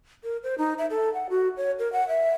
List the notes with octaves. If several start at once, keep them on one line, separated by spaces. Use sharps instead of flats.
A#4
C5
D#4
E5
A4
F#5
F#4
C#5
A#4
F#5
E5